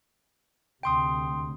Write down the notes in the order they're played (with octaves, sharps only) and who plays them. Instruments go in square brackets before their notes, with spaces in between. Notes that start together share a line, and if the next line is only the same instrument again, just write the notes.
[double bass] D2 C3 [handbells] G5 C6 D#6